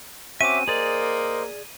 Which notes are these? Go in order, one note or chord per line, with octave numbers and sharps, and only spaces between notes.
C4 C#4 F#4 E5 D6 D#7
A#3 G#4 C5 D5 D#5